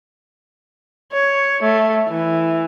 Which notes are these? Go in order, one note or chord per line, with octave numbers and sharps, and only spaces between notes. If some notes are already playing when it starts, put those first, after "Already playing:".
C#5
A3
E3